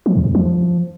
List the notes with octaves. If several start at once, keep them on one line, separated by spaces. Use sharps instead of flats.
F3
E2
F2
F3